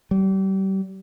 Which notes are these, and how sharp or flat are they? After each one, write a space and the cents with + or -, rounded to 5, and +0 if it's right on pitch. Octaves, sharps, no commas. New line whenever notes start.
G3 -30